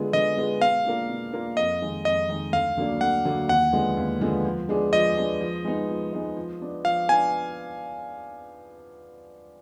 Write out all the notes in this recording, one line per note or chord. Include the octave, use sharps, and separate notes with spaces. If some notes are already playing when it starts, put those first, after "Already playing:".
Already playing: D3 G#3 B3 F4 G#4
D3 D#5
G#3 B3 F4 G#4
B2 F5
A#3 D4 F4 A#4
B2
A#3 D4 F4 A#4
F2 D#5
D#3 G#3 D#4
F2 D#5
D#3 G#3 D#4
D2 F5
D3 F#3 A#3 D4
D2 F#5
D3 F#3 A#3 D4
D#2 F#5
D3 F3 G#3 B3
D#2
D3 F3 G#3 B3
F3
G#3 B3 D4 G#4
F3 D#5
G#3 B3 D4 G#4
F3
G#3 B3 D#4
F3
G#3 B3 D#4
F3
B3 D4
F3 F5
B3 D4 G#5